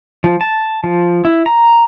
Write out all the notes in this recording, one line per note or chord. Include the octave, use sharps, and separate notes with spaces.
F3
A5
F3
E4
A#5